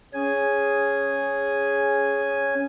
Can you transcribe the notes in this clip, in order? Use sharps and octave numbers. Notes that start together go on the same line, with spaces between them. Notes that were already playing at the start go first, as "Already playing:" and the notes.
C#4 G#4 G#5